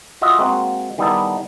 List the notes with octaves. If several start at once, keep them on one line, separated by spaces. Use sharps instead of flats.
F4 F#4 D#5 E5
G#3 A#3 C4 F#4
D#3 G3 B3 D#4 E4 A4